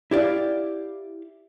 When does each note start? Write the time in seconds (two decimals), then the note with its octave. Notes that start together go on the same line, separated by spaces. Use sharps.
0.11 E4 G4 D5 F5